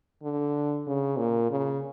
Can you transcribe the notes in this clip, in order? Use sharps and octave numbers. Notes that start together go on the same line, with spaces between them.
D3
C#3
A#2
C#3